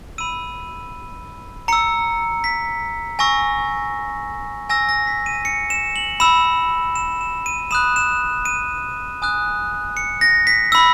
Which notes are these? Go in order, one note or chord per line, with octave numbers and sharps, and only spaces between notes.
B5 E6 D#7
A#5 E6 C#7
B6
G#5 C#6 E6 A#6
G#5 C#6 E6 A#6
A#6
B6
D#7
C#7
E7
F#7
B5 E6 E7
E7
E7
D#7
B5 D#6 F#6 E7
E7
D#7
G#5 D#6 F#6
C#7
A#6
B6
B5 E6